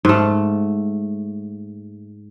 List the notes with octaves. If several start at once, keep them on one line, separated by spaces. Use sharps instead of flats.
G#2 A3